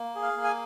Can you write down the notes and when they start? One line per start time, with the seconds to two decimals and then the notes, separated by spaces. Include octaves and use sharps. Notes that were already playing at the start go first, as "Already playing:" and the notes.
Already playing: A#3
0.15 G#4
0.22 F5
0.37 A#3
0.44 G#5